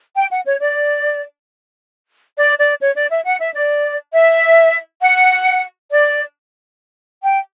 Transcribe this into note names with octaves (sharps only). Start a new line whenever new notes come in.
G5
F#5
C#5
D5
D5
D5
C#5
D5
E5
F#5
E5
D5
E5
F#5
D5
G5